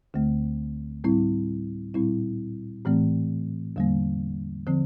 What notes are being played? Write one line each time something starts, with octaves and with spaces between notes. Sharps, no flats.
D2 D3 A3
A2 G3 C4 E4
A#2 G3 C4 E4
A2 E3 A3 C4
E2 D3 G3 A#3
D3 F3 C4